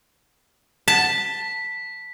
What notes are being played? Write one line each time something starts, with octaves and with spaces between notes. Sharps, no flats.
A5 B6